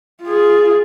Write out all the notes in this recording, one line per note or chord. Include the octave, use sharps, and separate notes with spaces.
F4 G#4